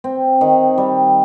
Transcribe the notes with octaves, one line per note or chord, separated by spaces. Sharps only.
C4
D#3
G3